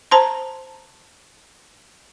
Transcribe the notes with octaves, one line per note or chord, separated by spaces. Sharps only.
C5 A5 A#5 C6